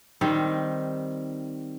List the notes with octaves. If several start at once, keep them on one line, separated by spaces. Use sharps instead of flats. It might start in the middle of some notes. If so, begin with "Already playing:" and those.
D#3 G3 C4